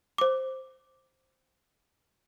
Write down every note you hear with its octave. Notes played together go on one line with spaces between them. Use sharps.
C5 D6